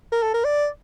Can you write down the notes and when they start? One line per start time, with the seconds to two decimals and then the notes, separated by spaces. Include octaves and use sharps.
0.12 A#4
0.23 A4
0.34 A#4
0.44 D5